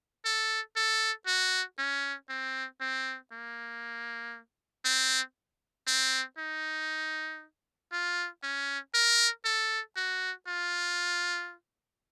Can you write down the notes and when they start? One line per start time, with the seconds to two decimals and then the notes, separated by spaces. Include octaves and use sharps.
0.25 A4
0.76 A4
1.27 F#4
1.78 C#4
2.29 C4
2.81 C4
3.32 A#3
4.85 C4
5.87 C4
6.38 D#4
7.92 F4
8.43 C#4
8.94 A#4
9.45 A4
9.96 F#4
10.47 F4